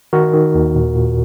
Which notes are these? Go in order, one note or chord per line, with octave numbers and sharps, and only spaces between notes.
D#3 F#4 A#4
D#3
D#2
A#2
A#2